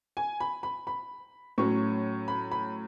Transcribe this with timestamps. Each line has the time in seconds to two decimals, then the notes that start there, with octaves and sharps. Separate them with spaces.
0.17 G#5
0.40 B5
0.63 B5
0.87 B5
1.58 A2 F#3 C#4 C#6
2.28 B5
2.52 B5